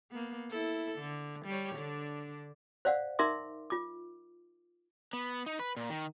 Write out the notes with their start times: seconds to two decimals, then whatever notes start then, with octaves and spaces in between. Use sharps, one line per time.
0.11 A#3 B3
0.51 E4 A4
0.99 D3
1.46 G3 G4 C#5
1.76 D3 D4
2.85 C5 D5 F5 F#5
3.19 D#4 A#4 E5 C6 D6
3.70 F4 D6
5.13 B3
5.46 D#4
5.59 B4
5.77 A#2
5.90 D#3